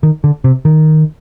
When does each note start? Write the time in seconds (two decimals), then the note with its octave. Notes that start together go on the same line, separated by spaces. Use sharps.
0.03 D#3
0.24 D3
0.44 C3
0.65 D#3